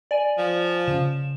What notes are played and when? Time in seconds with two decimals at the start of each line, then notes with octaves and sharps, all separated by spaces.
0.11 D5 G#5 D#7
0.38 F3
0.87 C#3 C#4 E7